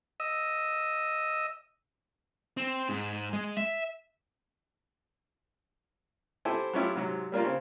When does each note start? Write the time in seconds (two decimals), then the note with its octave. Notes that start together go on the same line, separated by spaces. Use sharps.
0.20 D#5 E6
2.57 C4
2.89 G#2
3.33 G#3
3.57 E5
6.45 C4 E4 G4 A4 C5 G#5
6.73 F#3 A3 C#4 E4 F4 G4
6.95 G#2 C3 F#3
7.32 G3 A#3 D4 F4
7.44 C#3 C4